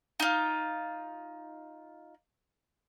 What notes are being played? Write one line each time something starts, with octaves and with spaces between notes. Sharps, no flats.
D#4 F4